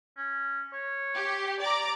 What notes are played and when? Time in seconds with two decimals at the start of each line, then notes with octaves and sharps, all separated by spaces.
0.17 C#4
0.73 C#5
1.15 G4
1.61 D5 A#5 D6